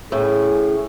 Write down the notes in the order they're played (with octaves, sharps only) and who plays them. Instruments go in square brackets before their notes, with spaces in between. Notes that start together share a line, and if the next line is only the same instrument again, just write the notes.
[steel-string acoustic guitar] A2 [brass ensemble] C#4 G#4